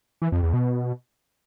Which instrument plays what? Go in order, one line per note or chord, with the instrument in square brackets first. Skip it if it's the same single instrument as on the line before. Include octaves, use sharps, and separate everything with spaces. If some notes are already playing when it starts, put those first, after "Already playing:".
[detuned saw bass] E3
F2
E2
B2